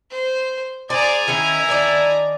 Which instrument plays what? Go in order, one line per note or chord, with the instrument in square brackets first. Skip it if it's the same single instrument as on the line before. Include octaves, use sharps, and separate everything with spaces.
[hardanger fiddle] C5
[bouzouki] G#4 C5 [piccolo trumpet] D5 [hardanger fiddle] G#5 A#5
[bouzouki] D#3 C#4 [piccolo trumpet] E4
[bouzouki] D#3 D4 D5